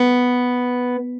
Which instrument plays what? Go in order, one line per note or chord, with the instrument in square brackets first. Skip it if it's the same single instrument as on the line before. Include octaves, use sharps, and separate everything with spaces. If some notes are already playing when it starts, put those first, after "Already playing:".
Already playing: [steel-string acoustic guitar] B3